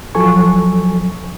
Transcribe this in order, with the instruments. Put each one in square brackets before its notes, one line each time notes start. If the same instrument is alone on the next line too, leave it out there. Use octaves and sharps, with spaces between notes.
[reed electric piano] F3 F#3 A4 G#5 C#6